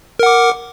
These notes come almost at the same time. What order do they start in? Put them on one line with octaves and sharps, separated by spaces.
A#4 F#5 D6